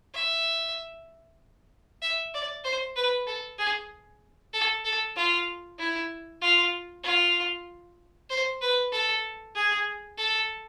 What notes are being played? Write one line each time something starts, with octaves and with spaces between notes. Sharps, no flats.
E5
E5
D5
C5
B4
A4
G#4
A4
A4
F4
E4
F4
F4
C5
B4
A4
G#4
A4